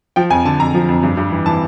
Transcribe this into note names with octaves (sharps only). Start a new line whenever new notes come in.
F3 G5
F2 G#5
D3 A5
F2 A#5
F3
F2
G2
G2
E3
E3 A5